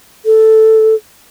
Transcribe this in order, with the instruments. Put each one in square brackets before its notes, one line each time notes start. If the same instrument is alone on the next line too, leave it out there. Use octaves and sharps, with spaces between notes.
[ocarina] A4